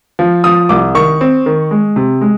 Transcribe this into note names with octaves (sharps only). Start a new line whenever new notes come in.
F3
F3 D#6
C2 D6
D#3 C#6
C4
D#3
G#3
C3
G#3